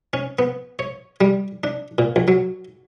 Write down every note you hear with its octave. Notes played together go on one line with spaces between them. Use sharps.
C#4
B3
C#5
G3
D4
A#2
A#1
F#3